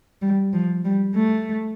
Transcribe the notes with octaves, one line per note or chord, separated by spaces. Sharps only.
G3
F3
G3
A3